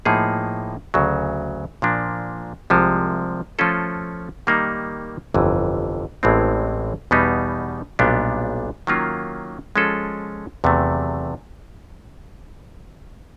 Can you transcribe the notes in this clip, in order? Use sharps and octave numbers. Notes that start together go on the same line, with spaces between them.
A2 F3 A#3 D#4 G#4
D2 C#3 F#3
A#2 F3 A#3 D4
C2 C3 F3 G#3
F3 A3 C#4 F4 A4
D#3 G3 A#3 D#4
G1 F2 C3 E3
A1 A2 E3 G#3 C4
E2 B2 G3 B3 D#4
B1 A#2 G3 B3 D4
D#3 F#3 A#3 C#4 F4
F3 G#3 C#4 F4 A4
E2 C3 D#3 F#3 A3